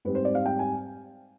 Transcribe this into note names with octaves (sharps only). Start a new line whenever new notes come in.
G#2 G3 C4 B4
C5
D5
F5
G5
G#5